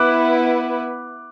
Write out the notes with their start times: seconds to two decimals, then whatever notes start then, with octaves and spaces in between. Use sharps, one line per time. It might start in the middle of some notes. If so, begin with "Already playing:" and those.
Already playing: B3 E4 B4 D6 F#6